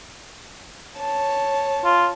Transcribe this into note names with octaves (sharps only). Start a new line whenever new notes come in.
C#5 A5
F4